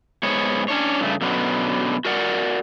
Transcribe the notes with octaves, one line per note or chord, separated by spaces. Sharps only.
G#2 B3 C#5
C#4 D4 C#5
G2 C#3 A3
B2 D3 F#3 B3 C#4
F#4 A#4 D5 F#5